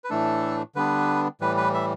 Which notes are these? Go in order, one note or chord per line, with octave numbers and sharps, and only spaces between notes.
B4
A2 E3 A3 D4 A4
D3 G3 B3 D4 B4
A2 E3 G3 B4
B4
E5